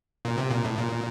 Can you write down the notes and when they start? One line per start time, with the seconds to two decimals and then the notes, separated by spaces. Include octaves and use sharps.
0.25 A#2
0.38 C3
0.51 A#2
0.64 A2
0.78 A#2